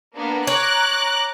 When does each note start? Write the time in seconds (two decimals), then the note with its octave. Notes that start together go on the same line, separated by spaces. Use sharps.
0.17 A#3 B3 D4
0.47 C#5 A#5 D6 F#6